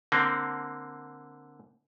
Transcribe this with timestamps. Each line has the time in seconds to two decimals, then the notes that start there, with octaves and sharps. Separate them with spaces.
0.12 D3 A#3 C4